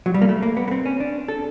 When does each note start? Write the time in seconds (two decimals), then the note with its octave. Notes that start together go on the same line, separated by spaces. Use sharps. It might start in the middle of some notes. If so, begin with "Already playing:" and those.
0.06 F#3
0.14 G3
0.22 A#3
0.29 A3
0.43 A#3
0.57 B3
0.68 B3
0.71 C4
0.86 C#4
1.00 D4
1.28 A4